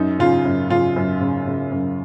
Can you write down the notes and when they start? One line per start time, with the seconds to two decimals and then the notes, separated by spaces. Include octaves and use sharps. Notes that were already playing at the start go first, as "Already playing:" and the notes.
Already playing: F#2 D#4
0.19 C#3 F4
0.45 F#2
0.70 C#3 F4
0.96 F#2
1.21 C#3
1.47 C#3
1.72 F#2